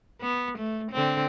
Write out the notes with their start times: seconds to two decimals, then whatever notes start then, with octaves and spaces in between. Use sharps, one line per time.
0.21 B3
0.58 A3
0.92 D3 C4